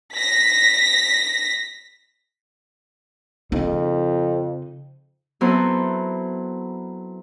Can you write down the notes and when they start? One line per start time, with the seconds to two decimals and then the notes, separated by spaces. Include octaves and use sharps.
0.12 A#6 B6
3.52 F2 C#3 D#4
5.41 F#3 B3 C4 E4 A4 C5